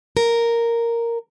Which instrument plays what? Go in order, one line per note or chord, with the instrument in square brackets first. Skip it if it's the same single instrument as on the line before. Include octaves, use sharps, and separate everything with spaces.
[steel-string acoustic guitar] A#4